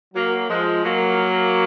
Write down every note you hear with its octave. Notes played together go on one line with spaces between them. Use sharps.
F#3 A#3
F3 G#3
F#3 A#3